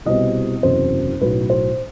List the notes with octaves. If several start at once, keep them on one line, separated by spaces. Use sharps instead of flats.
C2 B2 G3 C4 D#5
F#1 E2 C3 F#3 C5
B1 A2 F#3 B4
C5